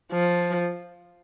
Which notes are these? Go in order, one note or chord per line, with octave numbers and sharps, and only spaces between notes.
F3